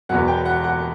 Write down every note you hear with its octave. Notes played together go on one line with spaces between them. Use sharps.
E1 E2 B2 F#3 F#5
G5
F#5
F#5